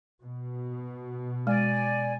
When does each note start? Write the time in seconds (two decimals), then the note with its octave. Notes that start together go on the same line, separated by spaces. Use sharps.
0.23 B2
1.47 G#3 D5 G#5